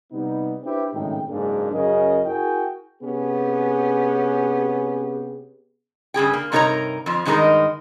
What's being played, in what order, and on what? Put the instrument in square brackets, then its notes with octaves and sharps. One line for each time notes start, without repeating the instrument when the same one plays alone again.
[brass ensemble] C3 G3 B3 D#4
D4 E4 G4 B4 C5 E5
G#1 F#2 A2 C#3 D#4 G5
F#1 G#2 A#3 D4 G#4
F#2 C#3 G#4 A#4 D#5
E4 F#4 G#4 A#4 G5 G#5
[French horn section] C3 B3 C#4 G4 G#4
[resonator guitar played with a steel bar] G2 C#3 G#4 G5
A#3
G2 C3 D#4 A#4 C#5 A#5
F2 F3
G2 D#3 G#3 B3 D#4 A#4